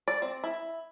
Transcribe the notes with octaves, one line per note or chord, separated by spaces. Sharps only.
D5
C4
E4